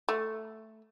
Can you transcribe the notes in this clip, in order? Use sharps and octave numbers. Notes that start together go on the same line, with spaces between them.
A3